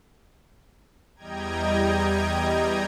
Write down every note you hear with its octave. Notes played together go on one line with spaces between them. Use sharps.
E2 G3 D#5 G5 A#5 G#6